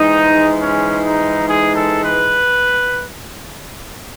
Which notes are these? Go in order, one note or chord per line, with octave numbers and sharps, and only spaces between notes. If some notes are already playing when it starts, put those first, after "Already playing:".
Already playing: G#2 E3 G#3 D#4
C#4
D#4
G#4
A4
B4